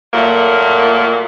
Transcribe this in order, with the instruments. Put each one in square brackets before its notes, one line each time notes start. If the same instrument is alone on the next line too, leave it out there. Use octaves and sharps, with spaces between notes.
[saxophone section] A#2 F#3 A3 A#3